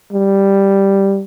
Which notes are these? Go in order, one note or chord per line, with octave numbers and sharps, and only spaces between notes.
G3